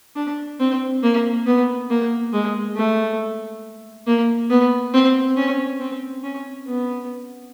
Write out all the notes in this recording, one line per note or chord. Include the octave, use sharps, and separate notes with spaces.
D4
C4
A#3
B3
A#3
G#3
A3
A#3
B3
C4
C#4
C4
C#4
B3